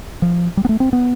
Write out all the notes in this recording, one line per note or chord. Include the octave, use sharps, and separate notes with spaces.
F3
G3
B3
A3
C4
B3